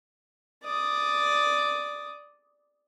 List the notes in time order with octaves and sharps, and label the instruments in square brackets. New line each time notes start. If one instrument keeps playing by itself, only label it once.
[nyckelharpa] D5 D#6